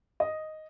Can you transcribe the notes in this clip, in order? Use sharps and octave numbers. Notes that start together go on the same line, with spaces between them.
D#5